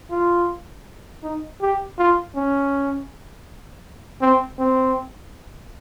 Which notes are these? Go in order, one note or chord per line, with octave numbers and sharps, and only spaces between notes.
F4
D#4
G4
F4
C#4
C4
C4